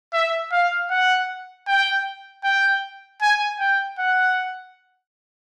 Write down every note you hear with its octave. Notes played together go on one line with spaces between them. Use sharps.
E5
F5
F#5
G5
G5
G#5
G5
F#5